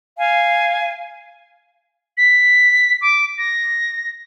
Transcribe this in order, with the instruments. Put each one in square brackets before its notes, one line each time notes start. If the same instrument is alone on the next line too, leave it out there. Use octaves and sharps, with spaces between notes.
[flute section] F5 G#5
[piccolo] B6
D6
A#6